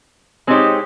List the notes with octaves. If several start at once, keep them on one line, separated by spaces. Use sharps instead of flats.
G#3 C4 D#4 G4 C#5